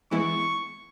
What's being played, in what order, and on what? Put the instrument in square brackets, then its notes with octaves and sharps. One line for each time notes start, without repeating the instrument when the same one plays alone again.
[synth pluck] E3 G#3 B3 E4 [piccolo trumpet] C#6